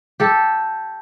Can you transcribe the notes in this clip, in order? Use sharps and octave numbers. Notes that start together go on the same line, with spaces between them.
G4 A4